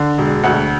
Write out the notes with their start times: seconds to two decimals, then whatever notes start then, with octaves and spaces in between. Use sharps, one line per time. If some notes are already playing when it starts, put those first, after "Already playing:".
Already playing: D3
0.18 E1
0.44 D2 F#5